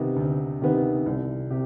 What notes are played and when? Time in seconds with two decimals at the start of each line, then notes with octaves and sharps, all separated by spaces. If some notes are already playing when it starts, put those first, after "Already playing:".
Already playing: C3 D#3 B3 D#4
0.16 D2
0.61 C3 D#3 B3 D#4
1.06 C2
1.50 C3 G4